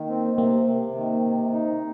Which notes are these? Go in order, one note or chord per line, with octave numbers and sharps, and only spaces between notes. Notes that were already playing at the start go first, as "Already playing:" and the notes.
Already playing: D#3 A#3
C4
C3 A#3
C3
D#3
C3
D#4